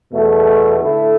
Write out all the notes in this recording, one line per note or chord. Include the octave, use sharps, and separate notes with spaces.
E2 B2 A3
D3 A3 E4 A4